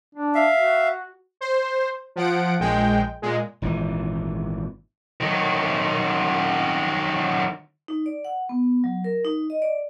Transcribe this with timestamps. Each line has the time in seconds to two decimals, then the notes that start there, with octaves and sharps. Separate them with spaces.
0.15 D4
0.35 E5 F5
0.56 F#4
1.41 C5
2.16 F3 F#5 D7
2.59 A#1 G#3 G5
3.22 A#2 G#3
3.62 G#1 A#2 D#3 E3
5.21 D#3 F#3
7.88 D#4
8.06 D5
8.25 F#5
8.49 B3
8.84 F#3
9.04 A#4
9.24 D#4
9.50 D#5
9.62 D5